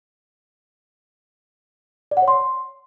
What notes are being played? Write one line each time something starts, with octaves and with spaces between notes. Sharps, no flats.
D5
F#5
C#5
C6